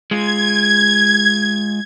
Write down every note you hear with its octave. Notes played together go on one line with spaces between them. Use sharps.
G#3 F4 G#6